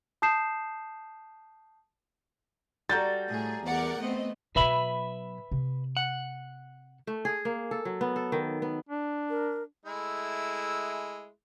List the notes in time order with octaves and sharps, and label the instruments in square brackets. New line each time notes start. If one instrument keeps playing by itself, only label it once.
[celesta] A5 D#6 G6 C7 E7
[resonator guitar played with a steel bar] G3 F#4 A4 [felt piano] A#5 G6 A6
[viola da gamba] A2 [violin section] G#4
[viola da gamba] E2 [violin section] A#4 D5 F#5
[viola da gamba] A3 B3 [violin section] C4 D#5
[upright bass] B2 F#3 [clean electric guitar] B4 E5 B5
[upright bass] C3
[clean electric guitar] F#5
[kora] A3
G#4
A#3
A4
F#3
B3
A4
D#3
B3
[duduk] D4
[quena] A#4
[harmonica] G#3 A3 E4